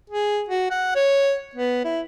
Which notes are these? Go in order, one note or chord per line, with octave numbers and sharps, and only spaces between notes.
G#4
F#4
F#5
C#5
B3
E4